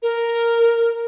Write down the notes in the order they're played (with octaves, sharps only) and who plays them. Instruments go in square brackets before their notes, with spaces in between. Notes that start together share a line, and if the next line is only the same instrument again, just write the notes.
[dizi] A#4